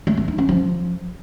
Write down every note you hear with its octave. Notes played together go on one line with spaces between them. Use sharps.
A3
B3
D#4
C#4
F3